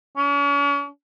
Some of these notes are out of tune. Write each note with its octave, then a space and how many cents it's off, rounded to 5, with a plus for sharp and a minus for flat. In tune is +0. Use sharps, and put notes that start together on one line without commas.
C#4 +40